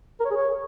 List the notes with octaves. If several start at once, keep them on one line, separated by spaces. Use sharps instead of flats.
A#4
C#5
G#4
C#5